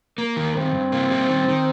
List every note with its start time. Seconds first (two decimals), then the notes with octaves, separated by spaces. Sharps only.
0.18 A#3 A#4
0.37 D#3
0.55 G2 C4
0.74 G2
0.92 A#3
1.11 G3
1.29 D#3
1.48 D#3